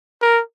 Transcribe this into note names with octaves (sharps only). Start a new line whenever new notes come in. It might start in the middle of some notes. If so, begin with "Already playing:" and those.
A#4